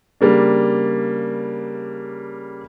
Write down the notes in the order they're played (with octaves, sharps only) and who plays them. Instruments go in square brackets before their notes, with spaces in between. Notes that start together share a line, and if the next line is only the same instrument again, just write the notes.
[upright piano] C#3 G3 A#3 D4